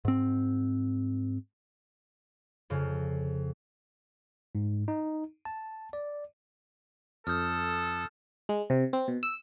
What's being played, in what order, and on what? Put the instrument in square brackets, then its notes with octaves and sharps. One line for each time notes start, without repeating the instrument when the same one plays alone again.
[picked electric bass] G#2 C4
[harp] F2 C#3
[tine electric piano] G#2
D#4
A5
D5
[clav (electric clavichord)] F2 [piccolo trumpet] A4 [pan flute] D#6 [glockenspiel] F6 G6
[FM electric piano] G#3
C3
C4
B2
E6